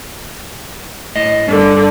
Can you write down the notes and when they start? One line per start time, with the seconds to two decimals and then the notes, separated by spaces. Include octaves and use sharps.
1.16 A2 D#5
1.48 G2 D3